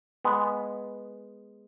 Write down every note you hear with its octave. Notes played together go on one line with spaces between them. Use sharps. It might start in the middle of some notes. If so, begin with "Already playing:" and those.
G#3 B3